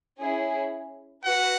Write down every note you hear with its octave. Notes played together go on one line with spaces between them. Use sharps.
C#4 E4 G#4
F#4 B4 F#5